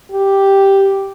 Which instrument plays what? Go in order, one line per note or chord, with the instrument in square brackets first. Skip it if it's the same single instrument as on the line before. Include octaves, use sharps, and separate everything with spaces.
[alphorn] G4